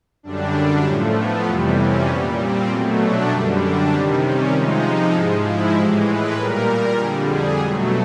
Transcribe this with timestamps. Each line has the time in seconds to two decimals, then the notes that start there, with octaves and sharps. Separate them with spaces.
0.23 F#2 D3 G3 D4
0.84 A2 F3 A3 C#4
1.16 B3
1.45 F2 C3 E3 G3 C4
1.76 C#4
2.07 A#2 G3 B3
2.38 C4
2.68 B2 F#3 A3 C#4
3.00 D4
3.29 F#2 D3 G3 G4
3.60 D4
3.91 C3 D#3 G3 C4
4.22 C#4
4.52 C3 F3 G#3 D#4
5.13 G#2 F3 G#3 E4
5.44 E4
5.74 A2 E3 G#3 G4
6.06 B4
6.36 A#2 G3 A#4
6.97 F2 D3 G3 G#4
7.28 G#4
7.59 B2 F#3 A3